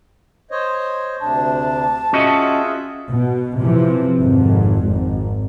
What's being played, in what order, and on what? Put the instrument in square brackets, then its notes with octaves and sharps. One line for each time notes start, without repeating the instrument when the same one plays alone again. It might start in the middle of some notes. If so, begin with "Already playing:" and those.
[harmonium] C5 C#5 D#5
[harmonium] D2 C3 D4 [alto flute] A5
[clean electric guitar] C#4 F#4 D#5 [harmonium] F4 G#4 E5
[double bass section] B2
C3 E3 F3
G#1 F2
G#1